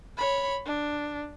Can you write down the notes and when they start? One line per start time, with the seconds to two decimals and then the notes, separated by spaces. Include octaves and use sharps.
0.17 C#5 B5
0.66 D4